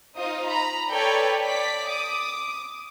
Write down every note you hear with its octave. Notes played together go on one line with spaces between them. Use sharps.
D#4 F4 C5 D#5 D#6
A#5 B5
A4 B4 C#5 D5 G5
D5 B6
D6 D#6